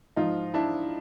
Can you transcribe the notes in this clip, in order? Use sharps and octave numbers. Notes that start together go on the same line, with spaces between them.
G#2 F3 D#4 F4
D4 E4